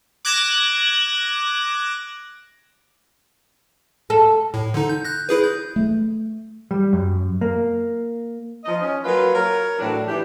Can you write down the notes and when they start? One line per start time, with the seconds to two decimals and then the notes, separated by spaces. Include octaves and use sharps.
0.25 D6 F#6 G#6 A#6 E7
4.10 A4
4.54 A2
4.74 D3 D#4
4.89 G6
5.05 F#6 G6 A#6
5.29 E4 G#4 B4
5.43 G6
5.76 A3
6.71 G3
6.93 F#2
7.41 A#3
8.65 F3 D#4 D#5
8.82 C#4
9.05 F#3 A#3 F4 B4
9.34 A#4 C#5
9.79 A2 E3 F#3 D4
10.09 E3 D4 E4 G4